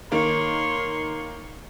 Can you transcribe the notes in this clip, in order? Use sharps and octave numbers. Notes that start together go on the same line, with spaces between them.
D#3 A#3 C#5 C6